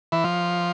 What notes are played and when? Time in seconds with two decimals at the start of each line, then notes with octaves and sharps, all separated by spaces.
0.12 E3
0.24 F3